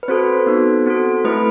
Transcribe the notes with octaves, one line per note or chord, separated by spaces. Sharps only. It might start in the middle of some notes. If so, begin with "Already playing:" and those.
B4
C4 F#4 A4 C5
B3 D#4 F#4 A4
C4 F#4 A4
A3 E4 A4 B4